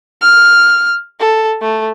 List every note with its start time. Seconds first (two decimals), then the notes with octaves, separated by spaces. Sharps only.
0.21 F6
1.20 A4
1.61 A3